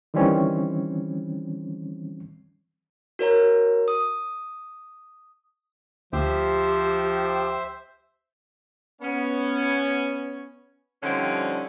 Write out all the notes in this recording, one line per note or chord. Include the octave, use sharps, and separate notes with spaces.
D#3 E3 G3 C4 C#4
F#4 A#4 C#5 A#5
D#6
D2 F3 G4 C5 E5
B3 C#4
D3 F3 G3 C4 C#4 D#4